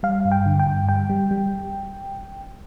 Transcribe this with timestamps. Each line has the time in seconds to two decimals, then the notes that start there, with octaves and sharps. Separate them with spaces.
0.03 G3 F5
0.25 G2
0.32 G5
0.46 D3
0.59 G5
0.66 G2
0.89 G3 G5
1.10 G3
1.31 G3